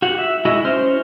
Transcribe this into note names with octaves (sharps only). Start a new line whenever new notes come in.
F#4 G4 F#5
E5
G#3 E4 F#4 D#5 E5
C#4 C5 C6 F6